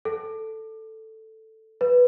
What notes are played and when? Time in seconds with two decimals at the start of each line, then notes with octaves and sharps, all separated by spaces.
0.05 A4
1.81 B4